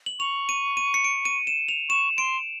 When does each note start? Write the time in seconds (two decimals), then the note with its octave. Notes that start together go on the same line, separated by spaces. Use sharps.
0.06 F#7
0.19 C#6 F7
0.49 D#7
0.77 D#7
0.94 C#7
1.04 D7
1.25 D#7
1.47 E7
1.69 F7
1.89 C#6 E7
2.18 C6 D7